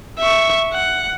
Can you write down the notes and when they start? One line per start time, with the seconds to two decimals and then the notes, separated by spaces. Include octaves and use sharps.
0.19 E5 C#6
0.73 F#5